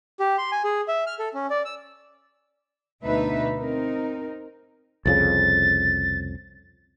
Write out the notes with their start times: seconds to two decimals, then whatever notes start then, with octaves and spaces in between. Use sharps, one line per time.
0.20 G4
0.38 C6
0.52 G#5
0.64 G#4
0.88 E5
1.07 F6
1.19 A4
1.34 C#4
1.50 D5
1.65 E6
3.05 D2 B2 D4 D#4 B4 E5
3.57 C4 D#4 A#4
5.06 C2 F2 C#3 A6